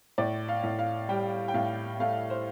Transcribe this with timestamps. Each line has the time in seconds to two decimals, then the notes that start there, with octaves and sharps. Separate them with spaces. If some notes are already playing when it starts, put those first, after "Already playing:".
0.18 A2 D5
0.48 F5
0.63 A2
0.79 F5
1.09 G3 G5
1.48 G5
1.54 A2 F5
2.00 A3 F5
2.30 C5